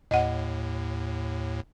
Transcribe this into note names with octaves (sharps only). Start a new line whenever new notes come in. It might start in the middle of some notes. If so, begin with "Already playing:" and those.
D#2 A2 D#5 F#5